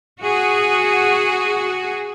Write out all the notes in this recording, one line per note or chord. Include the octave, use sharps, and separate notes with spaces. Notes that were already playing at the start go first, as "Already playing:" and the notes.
F#4 G#4